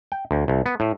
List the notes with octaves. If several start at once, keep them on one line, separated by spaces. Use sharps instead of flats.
G5
D2
C2
B3
A2